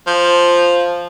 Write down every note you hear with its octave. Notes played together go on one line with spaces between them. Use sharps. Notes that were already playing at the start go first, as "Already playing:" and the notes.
F3